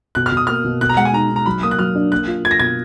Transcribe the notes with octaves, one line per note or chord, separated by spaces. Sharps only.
B2 F#6
F6
B2
D#6
A#3 F6
B2
B2 F#6
A#5
G#3 F#5
G#5
D#4 A#5
D#4
A#5
F#3 B5
A#3 D#6
F#6
F#3 F6
D4
A#3 F#6
F4
F4 G#6
A#6
B2 G#6